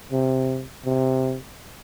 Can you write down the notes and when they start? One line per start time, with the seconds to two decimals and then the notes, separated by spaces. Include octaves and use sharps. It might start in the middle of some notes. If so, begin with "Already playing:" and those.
0.12 C3
0.85 C3